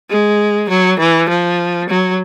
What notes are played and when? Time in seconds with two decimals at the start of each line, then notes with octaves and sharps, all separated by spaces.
0.10 G#3
0.69 F#3
1.00 E3
1.29 F3
1.89 F#3